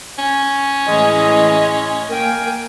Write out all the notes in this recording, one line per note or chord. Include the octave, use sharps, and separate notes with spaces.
C#4
A2 E3 G#3 D#5
A#3 A#4 G5 G#5